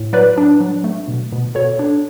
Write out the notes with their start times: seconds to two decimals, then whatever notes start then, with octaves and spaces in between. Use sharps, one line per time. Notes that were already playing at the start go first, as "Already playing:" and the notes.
Already playing: A2
0.13 F#3 B4 D5
0.38 D4
0.60 F#3
0.84 A3
1.08 B2
1.32 B2
1.55 B2 A4 C#5
1.79 D4